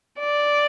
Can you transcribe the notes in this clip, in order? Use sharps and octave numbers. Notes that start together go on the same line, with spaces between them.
D5